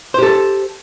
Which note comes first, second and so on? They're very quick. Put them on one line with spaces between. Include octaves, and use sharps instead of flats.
C5 G4 A4